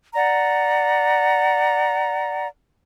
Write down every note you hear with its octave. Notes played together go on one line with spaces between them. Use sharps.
D5 F#5 A#5